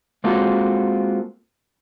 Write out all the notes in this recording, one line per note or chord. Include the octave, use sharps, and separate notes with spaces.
G#3 A#3 C4 F4 F#4 A4